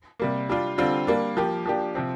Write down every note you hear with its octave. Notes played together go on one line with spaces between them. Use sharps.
C3 G3 A#3
G3 D4 F4
D3 G3 C4 F4
G3 A#3 D4
F3 A#3 G4
F3 A#3 D4 G4
C3 F3 C4